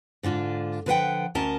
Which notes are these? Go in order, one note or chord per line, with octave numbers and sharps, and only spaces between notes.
G#2 D3 D4 F4
D3 F3 B4 D5 F#5 G5
D2 C#4 A#4 D#5 A5